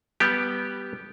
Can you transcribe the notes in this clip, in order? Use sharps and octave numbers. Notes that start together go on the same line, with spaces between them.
G3 B3 G4